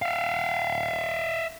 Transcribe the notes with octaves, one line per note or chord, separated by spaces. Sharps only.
E5 F5